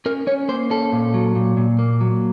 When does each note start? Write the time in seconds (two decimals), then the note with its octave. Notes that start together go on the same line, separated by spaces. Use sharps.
0.06 C#4 A#4
0.27 C#4 C#5
0.48 A#3 C5
0.70 C#4 A4
0.92 A#2
1.14 F#3
1.36 A#2
1.57 A#2
1.79 A#3
2.01 F#3